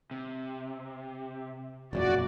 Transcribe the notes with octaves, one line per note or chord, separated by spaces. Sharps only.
C3
E1 F#2 A#2 F#4 D5